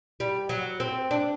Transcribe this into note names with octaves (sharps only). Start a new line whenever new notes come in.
G3
F#3
C4
D4